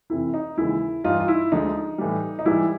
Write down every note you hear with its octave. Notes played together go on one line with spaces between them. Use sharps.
F2 C3 E3 E4
D#4
D#2 C#3 E3 G#3 E4
G2 E3 G3 D#4 F4
F4
E4
D2 D3 F3 G#3 D#4
A2 E3 G3
D#4
G#2 E3 G3 E4